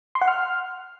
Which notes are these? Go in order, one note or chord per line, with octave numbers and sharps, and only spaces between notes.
C6
F#5
F6